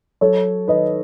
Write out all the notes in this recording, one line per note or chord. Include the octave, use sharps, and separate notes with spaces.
F#3 A4 C#5
D#3 B4 D#5